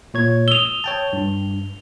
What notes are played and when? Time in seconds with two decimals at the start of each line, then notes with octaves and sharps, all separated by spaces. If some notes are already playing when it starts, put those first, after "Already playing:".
0.14 A#2 C#5 G#6
0.48 D#6 E6 F7 G7
0.84 C#5 G5 A5
1.13 G2